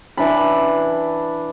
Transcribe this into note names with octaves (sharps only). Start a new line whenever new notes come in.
E3 D4 B5